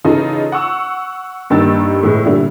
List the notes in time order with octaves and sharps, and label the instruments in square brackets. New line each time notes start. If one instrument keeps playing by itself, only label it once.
[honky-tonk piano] C#3 E3 C#4 D#4 F4 A4
F#5 C#6 E6
G2 D#3 A#3 G4 E6 A6
A2 E3 G#3
A#2 D3 G3 E4